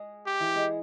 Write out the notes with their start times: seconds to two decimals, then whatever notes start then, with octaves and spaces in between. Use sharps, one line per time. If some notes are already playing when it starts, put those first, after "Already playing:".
Already playing: G#3 G#4
0.27 G4
0.40 E3 E4
0.55 G#3 G#4